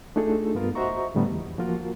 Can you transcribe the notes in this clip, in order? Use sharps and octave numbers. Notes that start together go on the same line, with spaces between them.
A3 D4 D#4 F4 G#4 A4
G2 B3 F4 A#4
F#4 C5 D#5 E5 A#5 C#6
A2 D3 G3 A3 B3
E2
F3 A#3 F4 F#4 A#4